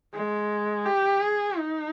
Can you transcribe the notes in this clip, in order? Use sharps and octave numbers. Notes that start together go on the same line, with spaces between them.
G#3
G4
G#4
D#4